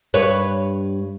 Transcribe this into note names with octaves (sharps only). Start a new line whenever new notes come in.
G2 B4 C#5